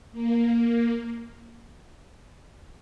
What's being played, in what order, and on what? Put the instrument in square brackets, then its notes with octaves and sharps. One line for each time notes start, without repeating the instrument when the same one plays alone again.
[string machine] A#3